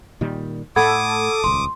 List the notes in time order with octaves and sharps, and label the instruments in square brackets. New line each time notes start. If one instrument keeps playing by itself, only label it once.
[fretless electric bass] A#2 D#3 G3
[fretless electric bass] A2 A3 [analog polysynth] A4 [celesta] F#5 B5 G#6 [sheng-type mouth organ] D6 D#6
[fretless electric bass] D#1 C#2 [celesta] C6